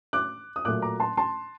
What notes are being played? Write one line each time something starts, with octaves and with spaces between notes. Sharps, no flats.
D6 F#6
D#6
A#2 F#3 A3 D6 F#6
A#5 D6
A5 C6
A5 C6